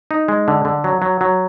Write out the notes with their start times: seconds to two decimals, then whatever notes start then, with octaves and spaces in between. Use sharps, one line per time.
0.11 D#4
0.28 G#3
0.48 D3
0.65 D3
0.84 F#3
1.02 F#3
1.21 F#3